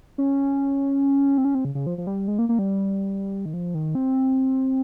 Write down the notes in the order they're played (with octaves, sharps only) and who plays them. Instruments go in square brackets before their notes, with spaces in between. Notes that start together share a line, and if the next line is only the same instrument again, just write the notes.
[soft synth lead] C#4
C4
C#4
C4
C#3
C#3
F3
F3
G3
G#3
A#3
A#3
G3
D#3
F3
D#3
C4